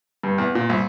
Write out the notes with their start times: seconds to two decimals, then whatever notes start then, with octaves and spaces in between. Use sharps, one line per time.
0.23 G2
0.38 E2
0.55 A#2
0.69 C2